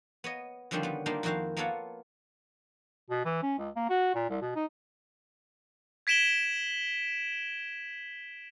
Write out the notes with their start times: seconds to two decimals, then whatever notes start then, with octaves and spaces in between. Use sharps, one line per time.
0.24 B3 C#5 D#5
0.71 D3 D#3 F3 G3 C4 C#4
0.83 G3 B3
1.06 G3 A#3 D4 D#4 F4
1.23 F2 D#3 E4 F#4 C5 F5
1.57 A#3 B3 F4 A4 C#5 F#5
3.10 B2
3.25 E3
3.42 C#4
3.58 C#2
3.76 A#3
3.89 F#4
4.15 A#2
4.29 C2
4.41 B2
4.55 D#4
6.07 G#6 B6 D7 E7 F#7 G7